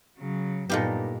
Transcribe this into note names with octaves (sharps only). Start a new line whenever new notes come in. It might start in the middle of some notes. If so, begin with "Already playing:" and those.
C#3 F#3
G2 A#2 A#3 B3 D#4 G4 A4